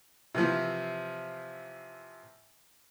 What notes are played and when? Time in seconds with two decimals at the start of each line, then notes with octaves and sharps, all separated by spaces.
0.35 C3 E3 F3